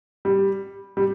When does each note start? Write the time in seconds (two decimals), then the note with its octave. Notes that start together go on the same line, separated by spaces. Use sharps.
0.25 G3
0.97 G3